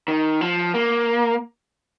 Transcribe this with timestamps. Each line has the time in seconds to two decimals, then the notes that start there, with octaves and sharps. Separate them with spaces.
0.08 D#3
0.41 F3
0.74 A#3